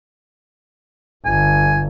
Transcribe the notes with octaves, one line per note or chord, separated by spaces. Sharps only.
G1 G#5